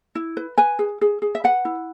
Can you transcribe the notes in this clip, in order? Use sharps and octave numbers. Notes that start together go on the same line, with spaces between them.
E4
B4
B4 G#5
G#4
G#4
G#4
E5
B4 F#5
E4